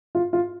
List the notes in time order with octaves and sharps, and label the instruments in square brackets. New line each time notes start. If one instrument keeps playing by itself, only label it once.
[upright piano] F4
F4